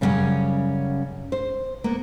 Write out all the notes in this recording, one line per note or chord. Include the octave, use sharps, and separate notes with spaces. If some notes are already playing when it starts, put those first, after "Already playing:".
F#2 C#3 F#3 G3 C#4 F#5
C5
A#3 B3